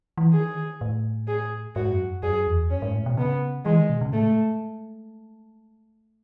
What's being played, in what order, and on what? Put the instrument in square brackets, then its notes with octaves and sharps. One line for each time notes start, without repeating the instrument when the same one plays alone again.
[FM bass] E3
[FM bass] D#3 [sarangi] G#4
[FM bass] A2
[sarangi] G#4
[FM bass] G#2 [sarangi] F#4
[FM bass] F#2
[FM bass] F#2 [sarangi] G#4
[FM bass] E2
[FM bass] F#2 [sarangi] C#4
[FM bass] G#2
A2
B2
[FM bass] C#3 [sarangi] B3
[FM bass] E3 [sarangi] G#3
[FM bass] D#3
B2
C#3
[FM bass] A2 [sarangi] A3